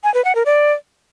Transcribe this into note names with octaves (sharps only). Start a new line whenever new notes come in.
G#5
B4
F#5
A#4
D5